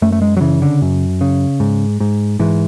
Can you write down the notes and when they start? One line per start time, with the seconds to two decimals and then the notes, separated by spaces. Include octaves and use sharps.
0.02 F#2 A3
0.12 A3
0.22 G#3
0.37 F#3
0.41 C#3 E3
0.62 D3
0.82 F#2
1.21 C#3
1.60 G#2
2.00 G#2
2.39 G#2 E3